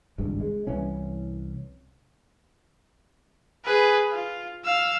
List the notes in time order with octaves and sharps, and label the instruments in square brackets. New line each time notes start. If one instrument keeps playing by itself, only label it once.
[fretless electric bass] G#1 C#2 G2
G#3
C2 E3 C#4
[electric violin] G#4 B4
F4
F5 E6